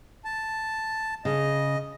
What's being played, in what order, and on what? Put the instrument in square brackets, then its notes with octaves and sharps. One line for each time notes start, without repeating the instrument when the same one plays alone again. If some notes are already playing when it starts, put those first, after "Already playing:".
[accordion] A5
[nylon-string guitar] C#3 [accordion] D#5